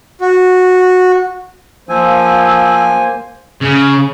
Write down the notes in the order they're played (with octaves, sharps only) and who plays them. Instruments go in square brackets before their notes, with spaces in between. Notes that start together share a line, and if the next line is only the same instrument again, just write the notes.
[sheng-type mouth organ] F#4
[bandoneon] F3 [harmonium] A#3 C5 [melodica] G#5 [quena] E6
[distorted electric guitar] C#3